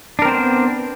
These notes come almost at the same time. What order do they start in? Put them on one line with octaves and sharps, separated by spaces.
D4 A#4 C4 C5 B3